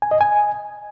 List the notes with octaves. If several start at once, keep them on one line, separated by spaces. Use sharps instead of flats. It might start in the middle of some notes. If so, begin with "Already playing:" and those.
G#5
D#5
G#5